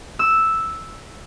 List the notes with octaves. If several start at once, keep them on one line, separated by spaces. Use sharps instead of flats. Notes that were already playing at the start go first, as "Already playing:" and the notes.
E6